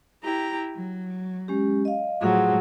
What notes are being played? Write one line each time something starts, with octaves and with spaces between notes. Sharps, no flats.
E4 G4 A#5
F#3
G#3 C#4 G4
D#5 F5
A2 F3 F#3 G#4 F#5